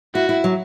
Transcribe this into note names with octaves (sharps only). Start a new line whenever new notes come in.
E4 F#4
E4
F#3